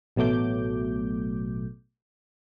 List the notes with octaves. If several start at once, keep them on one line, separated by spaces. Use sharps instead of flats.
A1 B2 F#3 A3 D6 G6